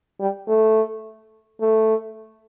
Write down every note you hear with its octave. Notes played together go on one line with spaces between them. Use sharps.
G3
A3
A3